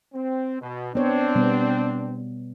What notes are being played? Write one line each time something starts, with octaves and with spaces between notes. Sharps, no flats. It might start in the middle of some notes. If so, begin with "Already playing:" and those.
C4
B2
B3 C4 D4 C#5
B2 G3 B3